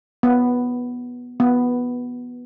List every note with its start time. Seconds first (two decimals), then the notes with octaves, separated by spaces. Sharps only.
0.23 B3
1.40 B3